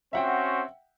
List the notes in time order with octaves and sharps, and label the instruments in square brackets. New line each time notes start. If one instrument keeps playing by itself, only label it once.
[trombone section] C4 C#4 F#4 [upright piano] E5 F#5 G5